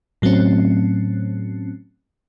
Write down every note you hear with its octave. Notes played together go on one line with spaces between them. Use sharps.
A2 F#3 A3 C4 C#4